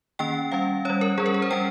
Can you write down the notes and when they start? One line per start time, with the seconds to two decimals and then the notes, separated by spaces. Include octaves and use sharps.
0.19 D#3 A#3 C#4 G5
0.52 G3 C#4 F5
0.85 G3 C#4 C#5
1.01 A#4
1.18 G3 C#4 G#4
1.26 A#4
1.34 G#4
1.42 C5
1.51 G3 C#4 G5